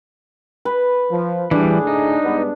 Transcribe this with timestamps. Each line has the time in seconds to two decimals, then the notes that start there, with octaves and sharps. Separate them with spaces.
0.65 B4
1.11 F3
1.51 A2 D3 E3 G3 D4 G#4
1.87 D#4
2.23 G2 G#3 B3